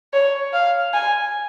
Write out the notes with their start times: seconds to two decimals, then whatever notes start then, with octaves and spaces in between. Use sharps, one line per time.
0.13 C#5
0.53 F5
0.93 G#5